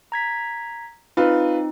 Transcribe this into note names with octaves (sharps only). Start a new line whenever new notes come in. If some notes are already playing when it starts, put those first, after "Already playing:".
A#5 G#6 B6
C4 D#4 F4 B4